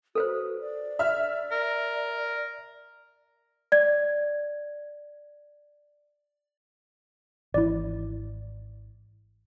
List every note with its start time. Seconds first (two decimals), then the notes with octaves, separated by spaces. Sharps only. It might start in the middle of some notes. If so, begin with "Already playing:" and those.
0.15 F#4 A4 B4 C5
0.60 D5
0.99 E5 F6
1.52 A#4
3.72 D5 G#6
7.54 G#1 E3 E4 D5